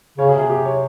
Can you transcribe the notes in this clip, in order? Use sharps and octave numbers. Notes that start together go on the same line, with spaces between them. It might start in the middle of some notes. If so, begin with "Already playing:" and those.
C#3 C#5
G#4
C3
G#4
G4
C#5